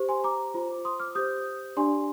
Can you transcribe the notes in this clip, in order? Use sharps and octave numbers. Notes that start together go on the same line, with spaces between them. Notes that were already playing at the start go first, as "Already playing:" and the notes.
Already playing: G4 C5
G#5 C6
A#5 D6
F4 C5
C6 D#6
D6 F6
G4 C5 D#6 G6
D4 G4 D5 G#5 C6